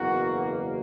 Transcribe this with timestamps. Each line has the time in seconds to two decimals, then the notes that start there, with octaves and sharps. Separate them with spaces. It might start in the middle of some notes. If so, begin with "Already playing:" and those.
Already playing: F#1 E2 B2 A#3 F#4